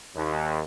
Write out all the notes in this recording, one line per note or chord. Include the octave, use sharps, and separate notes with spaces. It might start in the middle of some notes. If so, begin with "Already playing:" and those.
D#2